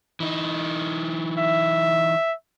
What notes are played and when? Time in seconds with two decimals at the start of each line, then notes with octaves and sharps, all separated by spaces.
0.20 E3 D#4
1.39 E5